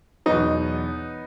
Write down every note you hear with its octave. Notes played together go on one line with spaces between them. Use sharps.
E2 B2 F#3 B3 D#4